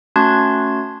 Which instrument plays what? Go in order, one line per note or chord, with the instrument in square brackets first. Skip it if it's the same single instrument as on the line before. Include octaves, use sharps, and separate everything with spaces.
[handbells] A3 C#4 F#4 A5 C6 G#6